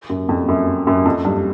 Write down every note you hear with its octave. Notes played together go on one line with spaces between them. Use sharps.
F#2
F2
F#2
F#2
F2
G2